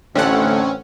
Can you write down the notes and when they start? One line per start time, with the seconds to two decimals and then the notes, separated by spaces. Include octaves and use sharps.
0.15 A1 D3 A3 C4 C#4 F#5